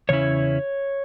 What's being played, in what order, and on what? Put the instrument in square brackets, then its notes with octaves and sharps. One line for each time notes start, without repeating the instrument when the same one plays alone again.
[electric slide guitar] E2 C#3 C#4 E4 C#5